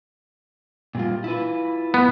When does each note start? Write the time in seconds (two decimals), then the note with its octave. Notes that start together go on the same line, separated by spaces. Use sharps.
0.95 A#2 G3 F4
1.24 E4 F4 B4
1.94 B3